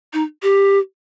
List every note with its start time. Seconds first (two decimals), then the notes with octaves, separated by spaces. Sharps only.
0.13 D#4
0.43 G4